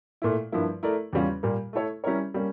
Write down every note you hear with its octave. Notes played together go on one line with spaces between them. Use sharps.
A#2 A3 E4
G2 F3 A#3 E4
A3 E4 A#4 D5
E2 C#3 G3 C#4 F4
A#2 G3 A#3
A3 E4 A4 C#5
G3 C#4 E4 A#4 C#5
G3 A#3 C#4